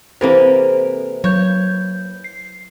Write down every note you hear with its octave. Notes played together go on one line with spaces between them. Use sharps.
C3 E3 A#3 C4 A4 C5
F#3 C#5 G6
C7